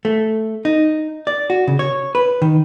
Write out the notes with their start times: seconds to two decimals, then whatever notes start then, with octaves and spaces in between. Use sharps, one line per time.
0.05 A3
0.65 D#4
1.27 D5
1.50 F#4
1.68 C#3
1.79 C#5
2.15 B4
2.42 D#3